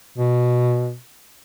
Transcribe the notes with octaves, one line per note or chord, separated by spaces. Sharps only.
B2